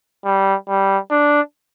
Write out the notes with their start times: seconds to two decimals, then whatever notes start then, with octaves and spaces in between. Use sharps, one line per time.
0.25 G3
0.68 G3
1.11 D4